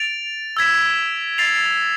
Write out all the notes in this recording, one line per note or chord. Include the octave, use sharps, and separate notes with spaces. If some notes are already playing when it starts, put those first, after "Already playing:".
Already playing: A6 D7 F7
E6 G#6 B6 E7
A6 C7 F7